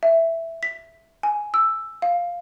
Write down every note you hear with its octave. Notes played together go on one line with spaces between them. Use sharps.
E5
B6
G#5
E6
F5